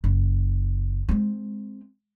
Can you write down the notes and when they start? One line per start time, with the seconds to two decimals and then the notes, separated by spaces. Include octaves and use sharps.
0.04 F#1
1.09 G#3 C4